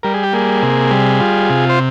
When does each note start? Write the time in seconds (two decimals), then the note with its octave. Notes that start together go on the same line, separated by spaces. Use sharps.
0.03 G3 A#4
0.14 G#4
0.23 G4
0.33 A#3 G#4
0.62 C3
0.91 G3
1.20 F4
1.50 C3
1.69 C5